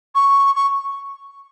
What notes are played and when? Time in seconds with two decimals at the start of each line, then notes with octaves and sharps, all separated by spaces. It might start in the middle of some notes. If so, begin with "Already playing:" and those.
0.15 C#6
0.55 C#6